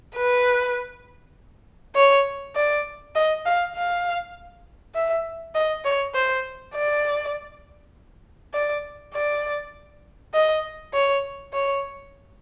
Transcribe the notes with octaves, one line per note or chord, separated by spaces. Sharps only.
B4
C#5
D5
D#5
F5
F5
E5
D#5
C#5
C5
D5
D5
D5
D#5
C#5
C#5